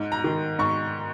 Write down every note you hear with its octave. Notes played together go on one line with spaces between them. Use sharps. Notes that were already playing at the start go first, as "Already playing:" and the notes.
Already playing: G#2
A#5
D#3
G#2 C#6